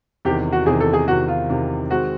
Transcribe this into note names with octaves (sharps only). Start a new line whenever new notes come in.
E2 C3 D#3 G4
F#4
E2 C3 D#3 G#4
A4
G#4
E2 C3 D#3 F#4
F4
E2 C3 D#3
D#3 G#3 C4 F#4